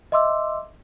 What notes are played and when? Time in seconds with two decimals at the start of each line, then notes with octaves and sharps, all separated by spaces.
0.12 D#5 E5 C6 D6 E6